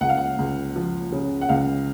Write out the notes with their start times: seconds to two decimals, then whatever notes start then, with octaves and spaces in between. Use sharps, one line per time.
0.01 C#2 F#5
0.09 F5
0.17 F#5
0.38 C#2
0.76 F3
1.12 C#3
1.41 F#5
1.49 C#2 F5